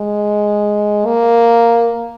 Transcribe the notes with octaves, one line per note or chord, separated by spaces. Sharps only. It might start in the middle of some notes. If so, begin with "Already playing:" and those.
Already playing: G#3
A#3